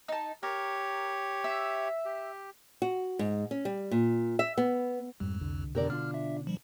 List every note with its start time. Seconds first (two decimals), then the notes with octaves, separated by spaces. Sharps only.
0.08 D#4 A5
0.43 G4 A#4 C#5
1.44 E5
2.05 G4
2.82 F#4
3.19 G#2
3.51 C#4
3.65 G3
3.91 A#2
4.39 E5
4.58 B3
5.20 F2 G#2 G3
5.41 C2 D3
5.75 F2 B2 D3 G4 A#4 D5
5.90 D4 F4 F6
6.14 E5
6.47 F3 G3